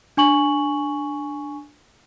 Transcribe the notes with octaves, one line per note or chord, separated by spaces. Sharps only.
D4 G#5 C#6 F#7